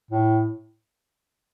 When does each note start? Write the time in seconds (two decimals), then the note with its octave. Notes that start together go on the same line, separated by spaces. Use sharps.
0.11 A2